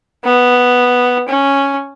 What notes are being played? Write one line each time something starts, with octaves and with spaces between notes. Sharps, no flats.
B3
C#4